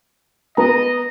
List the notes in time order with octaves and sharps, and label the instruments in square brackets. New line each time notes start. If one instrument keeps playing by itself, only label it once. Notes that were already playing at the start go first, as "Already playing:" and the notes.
[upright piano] B3 A#5 [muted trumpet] D#5